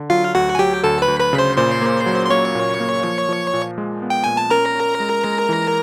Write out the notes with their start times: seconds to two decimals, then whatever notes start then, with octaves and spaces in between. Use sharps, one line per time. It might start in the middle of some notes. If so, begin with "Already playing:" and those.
Already playing: D3
0.10 F#3 F4 F5
0.34 D2 F#4 F#5
0.55 G#5
0.59 F#3 G4 G5
0.84 D2 A4 A5
1.02 B4 B5
1.08 D2
1.20 B4 B5
1.33 C#3
1.38 C5 C6
1.57 A#2 C5 C6
1.82 A#3
2.06 F#3
2.26 C6
2.30 A#3 C#5 C#6
2.55 A#2
2.80 A#3
3.04 F3
3.29 F3
3.53 A#2
3.78 G#3
4.02 B3
4.10 G5
4.24 A#2 G#5
4.37 A5
4.50 C#4 A#4 A#5
4.75 C#4
5.00 G#3
5.24 G#3
5.49 E3